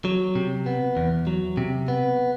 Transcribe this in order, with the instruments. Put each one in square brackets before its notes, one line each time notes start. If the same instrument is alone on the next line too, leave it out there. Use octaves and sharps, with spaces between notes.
[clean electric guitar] F#3
C3
B3
E2
F#3
C3
B3